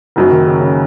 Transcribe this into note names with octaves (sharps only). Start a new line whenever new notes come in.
F#1 F#2 F#3 D#4
D#3
C#3
C#3